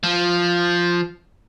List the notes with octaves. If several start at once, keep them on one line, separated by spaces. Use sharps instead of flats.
F3